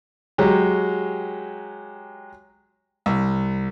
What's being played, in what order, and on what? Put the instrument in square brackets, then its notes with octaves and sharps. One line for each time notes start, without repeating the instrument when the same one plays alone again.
[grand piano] F#3 G#3 G4
[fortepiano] C2